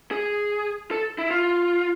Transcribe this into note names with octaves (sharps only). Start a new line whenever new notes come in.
G#4
A4
E4
F4